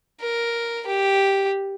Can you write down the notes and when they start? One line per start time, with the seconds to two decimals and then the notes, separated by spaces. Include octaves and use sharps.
0.21 A#4
0.87 G4